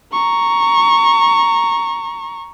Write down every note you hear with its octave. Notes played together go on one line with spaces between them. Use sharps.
A#5 C#6